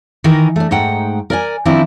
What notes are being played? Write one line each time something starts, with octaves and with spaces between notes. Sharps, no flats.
D#3 E3 D#4 A#4
A3 D4
G#2 A3 D#4 F#5 G5
A#4 D5 G#5
D#3 F3 C4 D4 E4